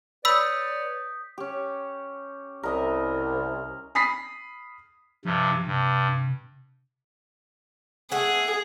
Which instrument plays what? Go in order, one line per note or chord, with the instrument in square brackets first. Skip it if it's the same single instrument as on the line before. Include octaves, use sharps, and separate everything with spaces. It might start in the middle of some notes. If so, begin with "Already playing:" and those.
[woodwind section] B4 C#5 D5 [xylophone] B5 E6 [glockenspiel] D#6 G6 B6
[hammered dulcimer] C#4 G4
[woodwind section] C2 [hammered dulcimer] A#4 D#5 E5
[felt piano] B5 D#6 B6 C7
[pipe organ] G2 C3 [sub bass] F3
[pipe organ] G2 [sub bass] C3
[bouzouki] A3 F#5 [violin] G#4